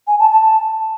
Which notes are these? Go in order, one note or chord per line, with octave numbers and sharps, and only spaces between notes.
G#5
A5
A5